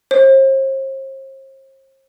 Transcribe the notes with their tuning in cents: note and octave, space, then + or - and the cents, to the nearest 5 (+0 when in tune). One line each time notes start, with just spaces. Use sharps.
C5 +40